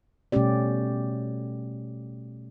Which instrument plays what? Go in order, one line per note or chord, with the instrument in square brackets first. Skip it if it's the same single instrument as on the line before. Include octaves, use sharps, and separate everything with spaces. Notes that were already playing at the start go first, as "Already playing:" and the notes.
[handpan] B2 G3 A3 C#4 G4 D5